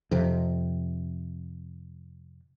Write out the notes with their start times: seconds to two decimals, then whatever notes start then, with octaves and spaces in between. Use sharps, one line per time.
0.11 F2 C3